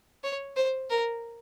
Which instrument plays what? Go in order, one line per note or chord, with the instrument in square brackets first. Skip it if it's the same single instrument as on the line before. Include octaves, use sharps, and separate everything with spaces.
[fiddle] C#5
C5
A#4